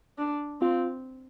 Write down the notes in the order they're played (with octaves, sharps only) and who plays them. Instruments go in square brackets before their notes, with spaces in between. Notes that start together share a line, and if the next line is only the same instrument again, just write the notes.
[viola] D4
[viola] C4 [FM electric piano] F4